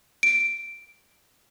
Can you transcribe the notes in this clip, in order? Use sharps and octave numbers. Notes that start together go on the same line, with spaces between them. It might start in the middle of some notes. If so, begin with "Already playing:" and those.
D7